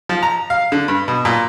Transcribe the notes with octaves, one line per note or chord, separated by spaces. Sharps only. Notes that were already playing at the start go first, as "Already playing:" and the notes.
F3
A#5
F5
D3
G2
B2
A#2